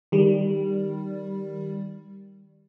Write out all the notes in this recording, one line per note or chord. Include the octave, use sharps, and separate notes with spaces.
D#3 G3